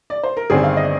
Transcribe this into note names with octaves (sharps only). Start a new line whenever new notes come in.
D5
C5
A#4
G1 G2 D#3 G3 C4 G#4
F5
D#5